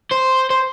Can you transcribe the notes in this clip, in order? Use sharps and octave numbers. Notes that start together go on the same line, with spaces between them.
C5
C5